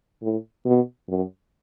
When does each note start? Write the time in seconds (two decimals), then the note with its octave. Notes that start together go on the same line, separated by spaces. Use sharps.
0.22 A2
0.65 B2
1.08 F#2